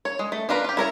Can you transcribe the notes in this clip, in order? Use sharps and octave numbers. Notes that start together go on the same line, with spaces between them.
C#5
G#3
A3
D4 F4 A#4 B4
F4 G4
E4 A#4 C#5